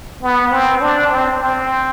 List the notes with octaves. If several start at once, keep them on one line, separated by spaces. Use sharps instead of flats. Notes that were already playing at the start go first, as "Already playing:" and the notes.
B3
C4
D4
C4
C4